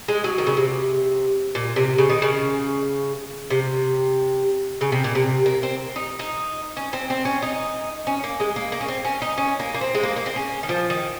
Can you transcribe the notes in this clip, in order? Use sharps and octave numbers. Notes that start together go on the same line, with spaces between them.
G#3
F#3
D#3
C#3
C3
A#2
C3
C#3
D#3
C#3
C3
C#3
C3
A#2
C3
A#3
C4
D#4
D#4
C#4
C4
C4
C#4
D#4
C#4
A#3
G#3
A#3
A#3
C#4
C4
C#4
D#4
C#4
A#3
A#3
C4
G#3
A#3
A#3
C4
C#4
D#3
F3
D#3